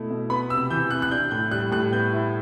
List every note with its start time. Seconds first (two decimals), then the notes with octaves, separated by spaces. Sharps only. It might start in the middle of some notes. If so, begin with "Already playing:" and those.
Already playing: B2 A3 E4
0.10 B2
0.30 B3 B5
0.50 C3 E6
0.70 E3 G6
0.91 C3 F#6
1.02 F#6
1.11 D4 G6
1.31 A2 G6
1.51 G3 F#6
1.71 A2 F#6
1.93 B3 G6
2.12 E4